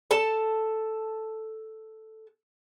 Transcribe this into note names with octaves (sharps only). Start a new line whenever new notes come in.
A4 A5